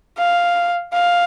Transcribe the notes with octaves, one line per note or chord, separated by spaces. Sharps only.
F5
F5